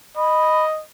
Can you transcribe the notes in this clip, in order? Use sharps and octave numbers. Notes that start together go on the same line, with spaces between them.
D#5 B5